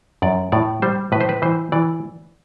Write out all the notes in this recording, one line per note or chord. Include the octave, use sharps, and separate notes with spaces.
F#2 D5
A2 D5
G3 C5
A2 B4
C5
B4
E3 C5
E3 D5